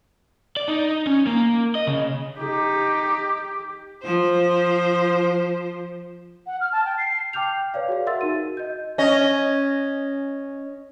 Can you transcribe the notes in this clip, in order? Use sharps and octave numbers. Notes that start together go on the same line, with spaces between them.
D5
D#4
C#4
A#3
D#5
C#3
D#4 G4
F3 C5
F#5
F6
A5
G5
C7
G5 A5 D6 F6 G6 F7
B4 C#5 D5 F5
F#4 G#4 F5
A#4 E5 F#5 C6 E6 A6
D#4 F#4 D#7
D#5 G6
C#4 D#5